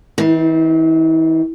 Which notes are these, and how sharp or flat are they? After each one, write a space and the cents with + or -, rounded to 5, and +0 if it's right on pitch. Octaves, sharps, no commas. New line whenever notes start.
E3 -35 C4 +0 D#4 +0